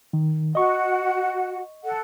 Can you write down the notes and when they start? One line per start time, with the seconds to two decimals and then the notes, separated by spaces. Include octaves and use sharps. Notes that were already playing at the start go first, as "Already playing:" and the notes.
0.13 D#3
0.55 F#4 D#5 F#5 C#6
1.85 A4 F#5